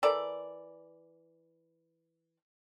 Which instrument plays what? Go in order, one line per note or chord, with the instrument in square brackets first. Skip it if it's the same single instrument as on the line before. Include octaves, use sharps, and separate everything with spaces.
[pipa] E3 A4 A#4 D5